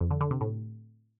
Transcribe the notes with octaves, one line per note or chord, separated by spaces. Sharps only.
F2
D3
D3
C3
A2